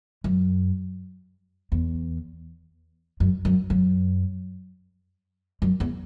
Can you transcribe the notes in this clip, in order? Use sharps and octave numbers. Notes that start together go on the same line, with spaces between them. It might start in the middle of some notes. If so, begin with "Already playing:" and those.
F#2
E2
F#2
F#2
F#2
F#2
E2